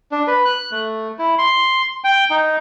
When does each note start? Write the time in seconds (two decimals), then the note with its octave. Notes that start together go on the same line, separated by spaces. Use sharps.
0.12 D4
0.27 B4
0.45 F#6
0.71 A3
1.19 E4
1.38 C6
2.04 G5
2.30 D#4